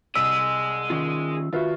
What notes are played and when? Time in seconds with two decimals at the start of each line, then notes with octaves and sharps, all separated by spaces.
0.16 C2 G#4 D#5 E6 B6 F#7
0.90 D#3 C#4 F4
1.53 D#3 F4 F#4 B4 E5